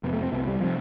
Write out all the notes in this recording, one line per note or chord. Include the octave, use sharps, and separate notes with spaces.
F2 C3 B3
A3
C4
C2 C3 B3
G3
C3 F3